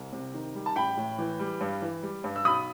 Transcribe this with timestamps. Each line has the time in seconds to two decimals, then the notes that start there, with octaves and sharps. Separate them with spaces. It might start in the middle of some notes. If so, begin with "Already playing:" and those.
Already playing: C2
0.13 C3
0.34 D#3
0.55 G3
0.66 A5
0.76 A1 G5 B5
0.97 A2
1.18 E3
1.39 G3
1.61 G2
1.82 E3
2.03 G3
2.24 G2
2.36 E6
2.45 B1 B5 D#6